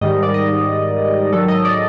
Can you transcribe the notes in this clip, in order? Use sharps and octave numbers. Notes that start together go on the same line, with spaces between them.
G#2 D#3 G3 D#5
D5
D#5
G#2 D#3 F#3 A4
D#5
D5